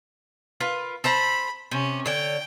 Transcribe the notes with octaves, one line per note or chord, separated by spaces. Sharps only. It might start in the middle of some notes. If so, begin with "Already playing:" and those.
F4 A#4 B4
A4 C5 A#5 B5
C3 C#4
D3 C#5 G5